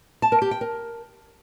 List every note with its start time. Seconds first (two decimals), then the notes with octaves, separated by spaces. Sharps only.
0.22 A5
0.32 A#4
0.42 G4
0.51 G5
0.61 A#4